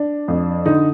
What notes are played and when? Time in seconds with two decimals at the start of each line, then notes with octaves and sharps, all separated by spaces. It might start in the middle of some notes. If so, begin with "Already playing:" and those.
Already playing: D4
0.28 F2
0.65 D3 D#4